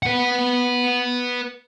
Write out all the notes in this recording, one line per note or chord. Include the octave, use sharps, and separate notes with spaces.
B4 F#5